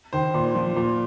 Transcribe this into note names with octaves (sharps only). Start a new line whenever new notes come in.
D#3 C5
A#2
F3
A#2